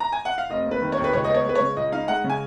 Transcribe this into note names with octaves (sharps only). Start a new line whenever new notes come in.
A#5
G#5
F#5
F5
F1 D#5
A#3
B4
D#3
C#5
D#2
B4
C#2 C#5
B3 D#5
C#5
G#3 B4
C#5
C#3
C#2 D#5
D#4 F5
G#3 F#5
C#3
G#5